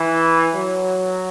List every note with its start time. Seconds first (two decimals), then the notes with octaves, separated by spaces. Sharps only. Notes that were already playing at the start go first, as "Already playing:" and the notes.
Already playing: E3
0.55 F#3